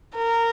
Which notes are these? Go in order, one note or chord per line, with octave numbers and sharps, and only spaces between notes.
A#4